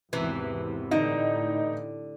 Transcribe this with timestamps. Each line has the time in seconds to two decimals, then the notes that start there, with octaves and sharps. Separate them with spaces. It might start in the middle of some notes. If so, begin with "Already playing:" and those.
0.13 G#1 E2 C3 E3
0.91 A2 D3 D#4